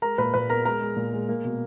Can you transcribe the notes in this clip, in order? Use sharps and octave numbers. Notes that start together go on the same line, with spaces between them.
G#3 A#4 A#5
A#2 B4 B5
A#2 B4 B5
B3 A#4 A#5
G#3 A#4 A#5
G#3
A#2
G#3
A#3
B2